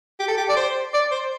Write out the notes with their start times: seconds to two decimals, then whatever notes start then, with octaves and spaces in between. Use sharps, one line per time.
0.20 G4
0.28 A4
0.38 G4
0.49 D5
0.56 C5
0.94 D5
1.11 C5